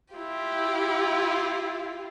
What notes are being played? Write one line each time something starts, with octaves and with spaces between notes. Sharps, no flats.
E4 F4 G4